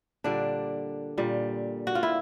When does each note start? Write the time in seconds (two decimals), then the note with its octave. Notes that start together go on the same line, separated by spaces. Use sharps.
0.24 A#2 D3 G3 D4
1.18 A#2 G3
1.87 F#4
1.95 F4
2.03 E4